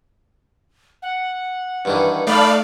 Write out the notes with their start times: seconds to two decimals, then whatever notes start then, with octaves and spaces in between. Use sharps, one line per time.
1.02 F#5
1.85 G2 D#3 E3
2.27 A3 D#4 D5 F5 B5